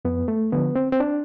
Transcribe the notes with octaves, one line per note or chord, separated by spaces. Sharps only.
F2 B3
A3
D3 F3 B3
C4
C4
D4